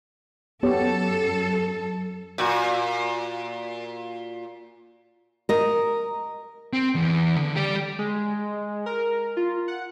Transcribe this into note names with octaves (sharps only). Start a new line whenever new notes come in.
F#2 B3 G4 A4 C#5
A#2 F#4
A#4 D#5
C4
E2
D3
G4 D5
G#3
A#4
F4
F#5